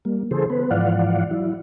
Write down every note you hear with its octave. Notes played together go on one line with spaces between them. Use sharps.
G3 A#3
C#3 E3 G#4 A4 C5
B3 B4
G#2 E3 F3 D5 F5 F#5
F#3 E4